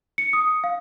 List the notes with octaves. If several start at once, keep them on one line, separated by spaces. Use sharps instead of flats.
C#7
D#6
F5